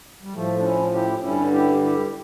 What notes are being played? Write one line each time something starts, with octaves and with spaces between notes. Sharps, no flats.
G3
A2 F3 A3
D4
C#4 E4
E4 G4
G2 D3 G3 C#4 E4
E4 G4
E4 G4